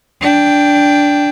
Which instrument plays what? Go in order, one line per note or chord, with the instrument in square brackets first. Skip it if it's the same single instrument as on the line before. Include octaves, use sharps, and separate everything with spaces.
[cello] D4 G5